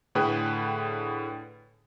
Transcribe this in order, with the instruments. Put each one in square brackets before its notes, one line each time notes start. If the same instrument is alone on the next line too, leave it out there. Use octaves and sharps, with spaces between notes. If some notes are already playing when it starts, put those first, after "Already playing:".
[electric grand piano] A2 D3 G#4 B4 G5